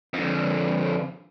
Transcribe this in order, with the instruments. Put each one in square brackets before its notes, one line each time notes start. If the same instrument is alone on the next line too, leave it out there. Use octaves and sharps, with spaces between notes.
[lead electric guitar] F2 D3